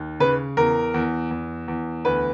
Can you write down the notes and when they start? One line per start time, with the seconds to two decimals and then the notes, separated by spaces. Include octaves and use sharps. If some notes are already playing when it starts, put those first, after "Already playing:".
Already playing: D#2
0.20 C#3 B4
0.57 E2 A#4
0.94 E2
1.31 E2
1.68 E2
2.05 D2 B4